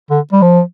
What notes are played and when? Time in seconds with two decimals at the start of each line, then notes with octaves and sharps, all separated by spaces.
0.10 D3
0.33 G3
0.42 F3